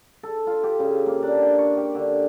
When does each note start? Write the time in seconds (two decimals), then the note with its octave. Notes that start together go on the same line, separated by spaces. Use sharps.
0.23 A4
0.47 F4
0.64 G4
0.80 C#3
1.06 A#3
1.23 D4
1.42 G5
1.59 C#6
1.77 G4
1.95 D3